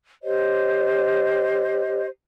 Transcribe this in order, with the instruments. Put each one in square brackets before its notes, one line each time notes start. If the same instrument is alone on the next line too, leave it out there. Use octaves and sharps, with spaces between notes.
[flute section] G4 C5 C#5 D#5